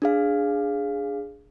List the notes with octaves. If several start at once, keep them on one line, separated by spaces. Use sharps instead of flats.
D4 G#4 F5